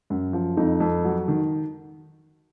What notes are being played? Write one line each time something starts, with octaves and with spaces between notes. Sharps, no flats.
F#2
F3
F2 C4 D#4
F2
F#3
D#3